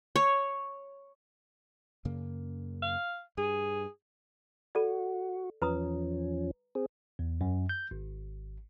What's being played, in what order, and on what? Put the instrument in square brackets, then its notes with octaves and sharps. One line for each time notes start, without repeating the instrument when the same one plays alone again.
[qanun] C#5
[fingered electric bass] F#2 C#3 A#3
[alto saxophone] F5
[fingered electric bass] G2 [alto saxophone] G#4
[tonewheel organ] F#4 [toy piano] A4 D5
[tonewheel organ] E2 F3 C#4 [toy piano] B4 A#5 D#6
[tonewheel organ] C4 G#4
[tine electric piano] E2
F#2
G6
G#1